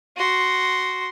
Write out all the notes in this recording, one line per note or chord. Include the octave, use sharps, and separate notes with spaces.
F#4 C6